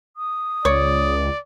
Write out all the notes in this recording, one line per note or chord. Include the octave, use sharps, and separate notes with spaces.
D#6
C#2 C#5 D5